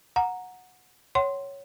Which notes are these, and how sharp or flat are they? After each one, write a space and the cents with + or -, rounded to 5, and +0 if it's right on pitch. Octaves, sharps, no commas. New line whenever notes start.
F#5 -15 A#5 +0
C#5 +0 F#5 +35 C6 +0